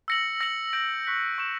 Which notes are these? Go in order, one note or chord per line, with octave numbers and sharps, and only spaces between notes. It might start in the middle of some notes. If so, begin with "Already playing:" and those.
E6 A#6 C#7 F#7
E6 A#6 C#7 F#7
G6 A#6 D7
C#6 F#6 B6 F#7
C#6 G6 C#7 E7